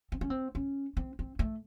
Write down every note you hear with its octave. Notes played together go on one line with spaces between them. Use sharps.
C4
C#4
C4
C#4
C4
C4
A3